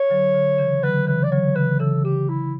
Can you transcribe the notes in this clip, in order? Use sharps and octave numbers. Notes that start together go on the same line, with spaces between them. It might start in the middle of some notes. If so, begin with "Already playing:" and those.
Already playing: C#5
D3 F#3
D3
C#3 E3
D3 F#3 B4
C#3 E3 B4
D5
D3 F#3 C#5
C#3 E3 B4
C#3 E3 A4
C#3 G4
E4